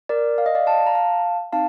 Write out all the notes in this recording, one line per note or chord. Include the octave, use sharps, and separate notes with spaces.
A#4 D5
F5
D#5
D5 F5
F5 A5
A#5
F5 A5
C4 D#4 F5 A5